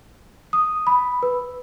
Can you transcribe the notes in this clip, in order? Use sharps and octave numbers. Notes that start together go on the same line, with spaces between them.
D#6
B5
B4